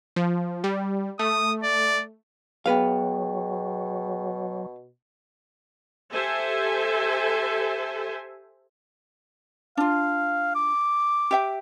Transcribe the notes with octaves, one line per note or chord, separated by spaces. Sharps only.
F3
G3
A3 D#6
D5
B2 F#3 B3 G#4 B4 F5 G5
G4 A4 C5 E5 G#5
D4 F4 F5
D6
G4 E5 G5